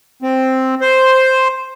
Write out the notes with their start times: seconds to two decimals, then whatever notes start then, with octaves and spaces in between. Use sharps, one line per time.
0.22 C4
0.81 C5